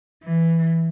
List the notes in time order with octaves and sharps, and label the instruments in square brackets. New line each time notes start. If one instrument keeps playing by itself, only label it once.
[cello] E3